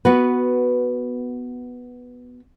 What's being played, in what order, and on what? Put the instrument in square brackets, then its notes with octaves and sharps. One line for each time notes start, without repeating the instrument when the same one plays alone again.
[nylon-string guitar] B3 F#4 B4